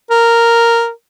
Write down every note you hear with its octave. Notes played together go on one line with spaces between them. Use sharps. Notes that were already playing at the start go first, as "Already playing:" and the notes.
A#4